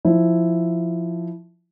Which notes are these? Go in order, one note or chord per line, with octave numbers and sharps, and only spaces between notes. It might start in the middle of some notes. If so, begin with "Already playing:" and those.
F3 E4